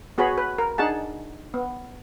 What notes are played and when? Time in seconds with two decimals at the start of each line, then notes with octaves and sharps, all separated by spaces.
0.18 B3 F#4 G#4 C#5 B5
0.38 B4
0.58 A#4
0.78 D4 D#4 G#4 F#5 A5
1.54 B3